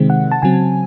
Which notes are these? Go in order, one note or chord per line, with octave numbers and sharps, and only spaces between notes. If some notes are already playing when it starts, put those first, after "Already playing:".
Already playing: C3 D#3 G#3 C4
F#5
A5
C#3 F#3 C4 G#5